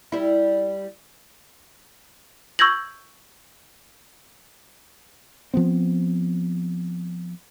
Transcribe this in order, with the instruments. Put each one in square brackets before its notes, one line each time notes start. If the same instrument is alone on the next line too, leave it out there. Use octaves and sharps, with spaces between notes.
[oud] G3 E4
[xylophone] C#6 E6 G6 G#6 A#6 F#7
[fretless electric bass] F3 B3 C4